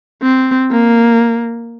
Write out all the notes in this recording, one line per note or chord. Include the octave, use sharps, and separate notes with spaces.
C4
A#3